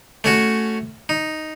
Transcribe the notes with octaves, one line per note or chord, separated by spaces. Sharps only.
A3 C#4 F#4
D#4